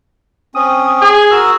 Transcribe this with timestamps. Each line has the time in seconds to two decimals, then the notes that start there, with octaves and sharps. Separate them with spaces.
0.55 C4 C#4 D#6
1.02 G#4
1.31 F#4 A#4 E6